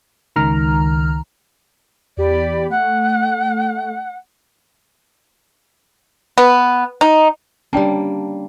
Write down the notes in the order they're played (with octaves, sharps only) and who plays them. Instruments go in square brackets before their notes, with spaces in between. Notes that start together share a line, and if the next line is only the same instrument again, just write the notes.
[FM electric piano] C#2 D#3 A#5 F6
[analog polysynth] E2 G4 B5 [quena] D5
[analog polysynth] A3 [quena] F#5
[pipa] B3
D#4
[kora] G3 A#3 [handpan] C#4 D4 [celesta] D5 G5 A5